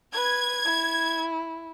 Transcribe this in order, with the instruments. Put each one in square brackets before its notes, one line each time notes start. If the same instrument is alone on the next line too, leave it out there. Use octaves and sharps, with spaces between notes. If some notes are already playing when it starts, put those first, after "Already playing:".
[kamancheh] B4 [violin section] G#6
[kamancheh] E4